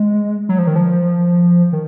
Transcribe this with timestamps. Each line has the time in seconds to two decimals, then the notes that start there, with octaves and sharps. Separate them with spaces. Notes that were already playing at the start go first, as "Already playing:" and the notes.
Already playing: G#3
0.49 F#3
0.58 F3
0.67 D#3
0.76 F3
1.73 D#3